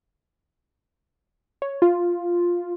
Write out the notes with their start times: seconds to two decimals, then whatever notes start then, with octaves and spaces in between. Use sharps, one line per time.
1.62 C#5
1.82 F4